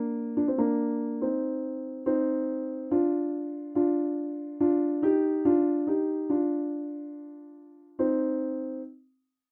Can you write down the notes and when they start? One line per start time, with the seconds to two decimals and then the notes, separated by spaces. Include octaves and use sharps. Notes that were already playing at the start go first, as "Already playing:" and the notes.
Already playing: A#3 D4
0.37 D4
0.48 C4
0.58 A#3 D4
1.22 C4 D#4
2.06 C4 D#4
2.91 D4 F4
3.75 D4 F4
4.60 D4 F4
5.03 D#4 G4
5.45 D4 F4
5.87 D#4 G4
6.30 D4 F4
7.99 C4 D#4